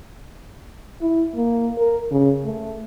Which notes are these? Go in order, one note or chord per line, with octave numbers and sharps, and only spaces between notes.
E4
A#3
A#4
C#3
A3